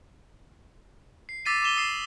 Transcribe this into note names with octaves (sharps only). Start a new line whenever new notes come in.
C7
D6 E6 A6 B6 C7 D#7
D6 B6 D#7 E7 G7
D#6 C7 E7